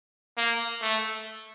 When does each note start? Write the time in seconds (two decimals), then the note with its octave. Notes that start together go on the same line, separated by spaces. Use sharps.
0.37 A#3
0.82 A3